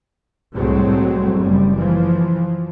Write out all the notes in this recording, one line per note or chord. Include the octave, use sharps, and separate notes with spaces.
C2 A2 F#3 G#3 A3 C4
F#1 G3
E3 F3